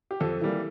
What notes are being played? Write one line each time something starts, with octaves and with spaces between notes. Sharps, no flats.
G4
F2 A4
E3 G3 A#3